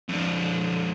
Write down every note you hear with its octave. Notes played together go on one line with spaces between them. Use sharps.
F2 D4